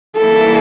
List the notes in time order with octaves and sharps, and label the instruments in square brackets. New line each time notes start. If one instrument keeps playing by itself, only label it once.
[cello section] E3 G3 A#3 E4 [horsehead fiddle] A4